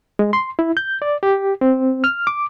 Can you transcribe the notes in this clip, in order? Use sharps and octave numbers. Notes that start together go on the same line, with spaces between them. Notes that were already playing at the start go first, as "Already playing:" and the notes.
G#3
C6
E4
G6
D5
G4
C4
F6
D6